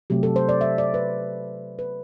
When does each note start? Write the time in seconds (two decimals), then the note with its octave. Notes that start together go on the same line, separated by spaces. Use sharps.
0.10 C3 F#3 A3 G4
0.23 A4
0.36 C5
0.49 D5
0.61 E5
0.78 D5
0.94 B4
1.79 B4